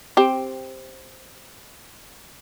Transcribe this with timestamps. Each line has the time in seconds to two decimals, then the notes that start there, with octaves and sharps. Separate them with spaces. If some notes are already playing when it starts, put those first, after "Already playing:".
0.17 C4 G4